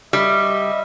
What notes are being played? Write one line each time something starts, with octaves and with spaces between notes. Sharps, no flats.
G3 D#5 E5